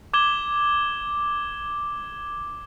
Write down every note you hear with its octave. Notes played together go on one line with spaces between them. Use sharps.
D6 G#6 E7 G7